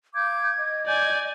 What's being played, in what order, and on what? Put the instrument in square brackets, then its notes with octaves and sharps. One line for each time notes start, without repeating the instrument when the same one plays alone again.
[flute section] F5 D6 G6 [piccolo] G#6
[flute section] D#5
[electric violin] D5 G#5 [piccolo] G6